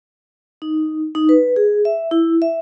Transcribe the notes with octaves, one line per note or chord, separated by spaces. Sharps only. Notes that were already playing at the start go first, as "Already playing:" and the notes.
D#4
D#4
B4
G#4
E5
E4
E5